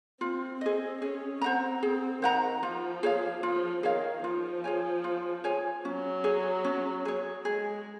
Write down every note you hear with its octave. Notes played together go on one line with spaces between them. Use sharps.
C4 F4
C4 G#4 D#5
C#4 G#4
C4 C5 F#5 A#5
C4 G#4
D#3 C5 F#5 A#5
F3 F4
G#4 C#5 F5
F3 F4
D#3 G#4 C#5 F5
F3 F4
G#4 C#5 G#5
F4
G#4 C#5 G#5
F#3 C#4
G#4 C#5
C#4
G#4 C#5
G#3 G#4